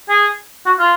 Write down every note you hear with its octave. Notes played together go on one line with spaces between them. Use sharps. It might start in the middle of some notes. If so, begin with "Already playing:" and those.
G#4
F#4
F4